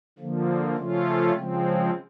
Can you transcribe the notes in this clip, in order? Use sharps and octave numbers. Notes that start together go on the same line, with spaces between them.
D3 F3 A#3
C#3 F3 A3 C#4 F4
C#3 F3 G#3 C4